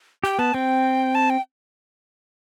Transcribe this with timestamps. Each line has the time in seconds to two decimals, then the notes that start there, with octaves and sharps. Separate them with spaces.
0.24 G4 G5
0.39 B3 A5
0.54 C4 G5
1.15 A5
1.30 G5